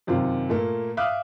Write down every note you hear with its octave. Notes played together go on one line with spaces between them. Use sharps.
F#2 C3 D#3 F4
A#2 A3 A#3
E5 F5 D6 D#6 F6 F#6